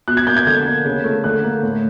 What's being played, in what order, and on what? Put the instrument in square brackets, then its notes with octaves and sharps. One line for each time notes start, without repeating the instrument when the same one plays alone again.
[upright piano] B2 F#6
G#6
A#3 G6
G#6
D3 G6
A#3
C#3
A3
D3 F#6
A#3
A2